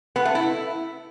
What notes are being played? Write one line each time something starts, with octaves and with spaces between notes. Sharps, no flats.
B3
A3
E4